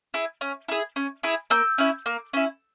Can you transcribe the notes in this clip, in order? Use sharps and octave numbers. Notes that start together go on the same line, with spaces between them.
E4 G#4
C#4
E4 G#4
C#4
E4 G#4
A#3 E6 G6
C#4 E4
A#3
C#4 E4